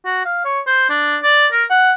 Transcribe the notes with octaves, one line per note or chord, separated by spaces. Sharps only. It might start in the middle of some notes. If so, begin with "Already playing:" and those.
F#4
F5
C#5
C5
D4
D5
A#4
F#5